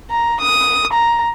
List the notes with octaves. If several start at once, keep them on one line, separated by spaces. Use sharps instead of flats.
A#5
D#6
A#5